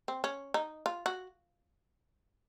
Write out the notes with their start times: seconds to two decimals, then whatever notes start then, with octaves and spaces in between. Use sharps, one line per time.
0.08 C4
0.24 C#4
0.54 D#4
0.86 F4
1.06 F#4